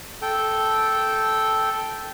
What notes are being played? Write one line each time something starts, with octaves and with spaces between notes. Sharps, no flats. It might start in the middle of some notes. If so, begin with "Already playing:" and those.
A4 G5